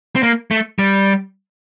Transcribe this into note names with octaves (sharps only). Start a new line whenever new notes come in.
C4
A#3
A3
G3